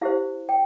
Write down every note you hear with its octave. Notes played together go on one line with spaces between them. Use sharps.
E4 G4 C5 F5
G5